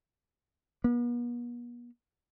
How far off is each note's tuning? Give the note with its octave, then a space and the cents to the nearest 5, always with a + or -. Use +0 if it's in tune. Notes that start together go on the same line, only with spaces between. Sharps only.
B3 -45